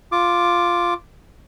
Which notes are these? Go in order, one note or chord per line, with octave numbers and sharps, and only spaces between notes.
F4 D6